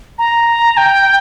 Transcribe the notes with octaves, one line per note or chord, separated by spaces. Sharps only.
A#5
G5